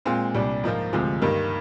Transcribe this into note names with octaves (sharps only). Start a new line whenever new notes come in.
A#2 G#3 C4 F4
C2 A#2 G3 D4
G#2 F3 A#3 F4
D2 C3 F3 G#3
G2 D#3 A#3